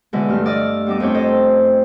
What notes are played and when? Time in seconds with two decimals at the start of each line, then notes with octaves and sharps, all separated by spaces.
0.13 B2 D3 E3 G#3
0.28 G2 A3 F6
0.46 D5 D#5 E6 F6
0.86 G3 B3 D4 D#4 D6
1.00 F2 A3 C4 C#5 G5
1.14 A4 C5 D#5 D#6